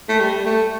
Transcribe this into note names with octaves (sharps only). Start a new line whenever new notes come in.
A3
G3
A3